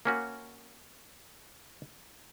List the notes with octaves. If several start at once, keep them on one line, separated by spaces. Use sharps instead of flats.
A#3 C#4 F#4